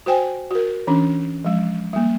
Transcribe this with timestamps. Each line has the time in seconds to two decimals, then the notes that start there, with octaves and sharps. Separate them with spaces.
0.06 F#4 C5 G5 G#5
0.51 F#4 A#4
0.87 E3 C#4 D4
1.45 F3 G#3
1.93 G3 A#3